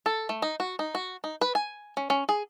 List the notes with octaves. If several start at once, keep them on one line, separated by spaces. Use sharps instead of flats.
A4
A3
D#4
F#4
D#4
F#4
D#4
B4
G#5
C#4
C#4
G#4